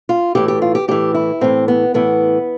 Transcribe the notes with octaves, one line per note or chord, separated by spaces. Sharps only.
F4
A2 E3 G4
G4
F4
G4
A2 E3 G4
E4
A2 E3 C4
B3
A2 E3 B3